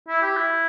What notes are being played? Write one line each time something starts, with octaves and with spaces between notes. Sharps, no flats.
E4
G4
E4